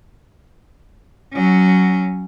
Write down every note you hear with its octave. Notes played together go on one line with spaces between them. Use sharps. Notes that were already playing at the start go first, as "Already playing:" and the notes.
F#3 C#4